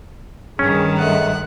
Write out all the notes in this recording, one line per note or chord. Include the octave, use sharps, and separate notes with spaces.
G2 D#3 C#4 G#4
G#3 A3 F#5